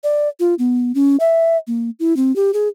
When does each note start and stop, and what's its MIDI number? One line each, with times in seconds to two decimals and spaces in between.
0.04 0.29 74
0.40 0.54 65
0.59 0.92 59
0.95 1.16 61
1.20 1.57 76
1.67 1.90 58
1.99 2.16 64
2.16 2.34 60
2.36 2.51 67
2.53 2.68 68